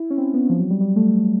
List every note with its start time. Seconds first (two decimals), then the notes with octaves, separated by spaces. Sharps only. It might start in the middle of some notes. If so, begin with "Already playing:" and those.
Already playing: E4
0.10 C#4
0.18 C4
0.34 B3
0.50 F3
0.59 F#3
0.70 G3
0.81 G3
0.96 A3